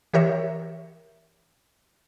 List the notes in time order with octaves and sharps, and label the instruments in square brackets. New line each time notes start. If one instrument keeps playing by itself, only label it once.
[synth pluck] E3 G4 A#4 C#5 E5